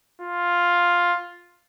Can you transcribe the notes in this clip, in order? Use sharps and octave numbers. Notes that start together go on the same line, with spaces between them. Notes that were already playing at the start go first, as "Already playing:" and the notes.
F4